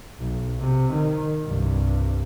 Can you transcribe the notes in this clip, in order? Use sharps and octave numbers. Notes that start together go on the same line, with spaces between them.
B1
C3
D#3
C2 G2